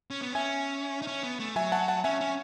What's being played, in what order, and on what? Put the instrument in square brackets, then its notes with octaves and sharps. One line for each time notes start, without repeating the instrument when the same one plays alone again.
[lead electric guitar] C#4
B3
[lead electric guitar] C#4 [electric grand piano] E5 G#5
[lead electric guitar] D#4
C#4
B3
A3
[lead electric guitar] F#3 [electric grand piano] E5 G#5
[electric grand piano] F#5 A5
F#5 A5
[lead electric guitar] C#4 [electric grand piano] E5 G#5
[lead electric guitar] C#4